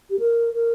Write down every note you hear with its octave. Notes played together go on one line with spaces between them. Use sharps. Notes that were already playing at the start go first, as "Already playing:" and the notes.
G4
A#4
A#4